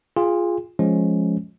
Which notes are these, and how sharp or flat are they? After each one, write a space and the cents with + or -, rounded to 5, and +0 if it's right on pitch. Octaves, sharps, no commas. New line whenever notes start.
F4 +0 G#4 +0 G#5 -40
F3 +0 G#3 +10 C#4 +0